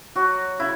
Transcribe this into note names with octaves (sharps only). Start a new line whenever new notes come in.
F#3 F#4
C#3 E4